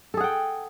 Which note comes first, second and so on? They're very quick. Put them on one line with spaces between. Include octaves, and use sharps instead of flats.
A4 G#4 F#5 G5